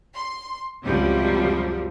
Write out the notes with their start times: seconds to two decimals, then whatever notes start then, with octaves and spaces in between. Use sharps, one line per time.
0.14 C6
0.84 C#2 F#2 C3 F3 G3